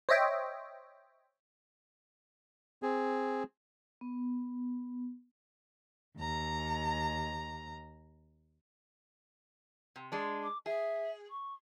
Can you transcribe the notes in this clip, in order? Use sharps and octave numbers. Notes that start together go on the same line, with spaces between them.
C5 C#5 D#5 E5 G5
C4 G#4
B3
D#2 A#5
C3
G#3 D4
D6
G#4 E5
C#6